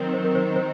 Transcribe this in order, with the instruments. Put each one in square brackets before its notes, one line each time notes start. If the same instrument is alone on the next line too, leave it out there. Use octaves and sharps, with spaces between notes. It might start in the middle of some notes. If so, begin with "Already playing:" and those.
Already playing: [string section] D#3 F#3 C4 [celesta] A#4
[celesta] C5
A#4
C5
C5